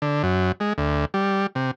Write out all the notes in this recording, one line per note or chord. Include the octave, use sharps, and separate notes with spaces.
D3
F#2
G#3
D2
G3
C3